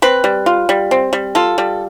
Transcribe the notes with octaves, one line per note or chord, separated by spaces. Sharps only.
C4 B4
G3
F4
G3
C4
G3
F4 A4
G3